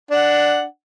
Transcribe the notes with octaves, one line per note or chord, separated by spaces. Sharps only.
D4 F#5